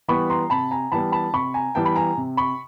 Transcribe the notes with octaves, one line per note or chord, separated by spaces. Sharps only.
E3 G3 B3 B5 C#6
A#5 C6
C3 A5 B5
G#5 A#5
E3 G3 B3 A5 B5
A5 B5
C3 B5 C#6
G#5 A#5
E3 G3 B3 G5 A5
B5
G#5 A#5
C3
B5 C#6